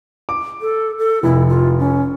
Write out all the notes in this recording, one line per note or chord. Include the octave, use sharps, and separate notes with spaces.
D6
A4
A4
F1 E4
F4
C#4